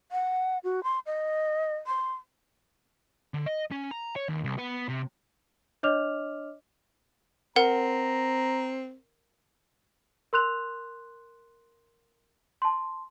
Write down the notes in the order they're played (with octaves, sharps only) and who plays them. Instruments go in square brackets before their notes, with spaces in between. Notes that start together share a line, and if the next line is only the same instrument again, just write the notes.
[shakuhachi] F#5
F#4
C6
D#5
C6
[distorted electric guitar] D3
D#5
C#4
A#5
C#5
D#2
C2
B3
C3
[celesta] D4 C#5 D#5 D6 F6 F7
[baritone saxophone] C4 [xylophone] A#4 F#5 [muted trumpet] A#5
[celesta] A#4 C6 F#6 F7
A5 C6